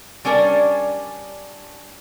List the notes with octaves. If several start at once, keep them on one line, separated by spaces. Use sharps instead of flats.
G3 C#4 D4 A#4 D5